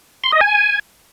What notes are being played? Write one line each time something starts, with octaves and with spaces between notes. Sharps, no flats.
C6
D#5
G#5